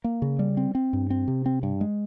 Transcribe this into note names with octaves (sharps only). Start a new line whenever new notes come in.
A#3
C#3
G3
C4
C4
G2
C4
C3
C4
G2
G#3